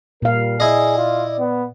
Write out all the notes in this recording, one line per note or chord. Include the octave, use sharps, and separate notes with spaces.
A#2 G3 A#4 F5
E4 G#4 D5 D#5
F4
B3